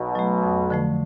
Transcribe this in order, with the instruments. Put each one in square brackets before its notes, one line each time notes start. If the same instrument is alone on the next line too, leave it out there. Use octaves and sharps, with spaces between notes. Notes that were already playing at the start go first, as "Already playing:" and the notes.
Already playing: [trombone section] B1 B2
[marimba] F#3 A3
F2
D3 F3 A3